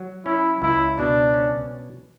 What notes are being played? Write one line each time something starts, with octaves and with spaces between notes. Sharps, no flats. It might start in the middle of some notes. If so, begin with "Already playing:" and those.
Already playing: F#3
C#4 E4
C#2 E4
B2 D4
C#4